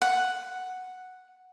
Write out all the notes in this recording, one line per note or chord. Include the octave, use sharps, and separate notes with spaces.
F#5